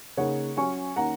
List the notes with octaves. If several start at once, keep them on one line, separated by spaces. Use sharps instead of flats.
C#3 A#3 D#4 C#5 F#5
F#3 C#4 G#5 C#6
D#3 A#3 C#4 F#5 A#5